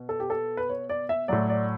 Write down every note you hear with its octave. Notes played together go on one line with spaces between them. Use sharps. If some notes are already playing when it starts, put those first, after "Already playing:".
Already playing: B2
A4
G4
A4
B4
C#5
D5
E5
A2 F#3 D5
D5